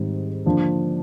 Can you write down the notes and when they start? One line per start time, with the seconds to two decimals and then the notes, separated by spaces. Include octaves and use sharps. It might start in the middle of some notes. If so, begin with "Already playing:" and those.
Already playing: G#2 D#3 G3 C4
0.46 D3 F3 A#3 D4